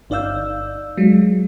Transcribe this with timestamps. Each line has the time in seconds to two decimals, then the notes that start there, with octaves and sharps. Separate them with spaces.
0.10 G1 D#4 D5 F5 E6 G6
0.97 F#3 G#3